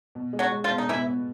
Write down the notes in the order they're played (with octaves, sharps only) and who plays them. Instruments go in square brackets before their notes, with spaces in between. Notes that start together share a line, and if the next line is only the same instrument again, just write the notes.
[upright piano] B2
G#3
[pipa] F#3 F#4
[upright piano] G#3
[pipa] F3 F4
[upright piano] B2
[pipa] D#4
[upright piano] B2 [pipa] E3 E4
[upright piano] B3